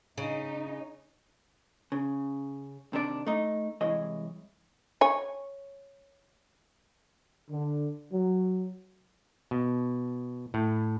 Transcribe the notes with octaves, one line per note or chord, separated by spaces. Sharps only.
C#3 D#4
C#3
C3 D#3 D4 G#4 D5
A3 D#4
C2 E3 G#3 C#5 D#5
C#5 G#5
D3
F#3
B2
A2